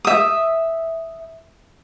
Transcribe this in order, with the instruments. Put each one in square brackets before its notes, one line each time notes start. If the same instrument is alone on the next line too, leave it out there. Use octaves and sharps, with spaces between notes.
[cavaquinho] E5 D#6